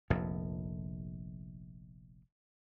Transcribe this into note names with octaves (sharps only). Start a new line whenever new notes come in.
F1 A#1 F2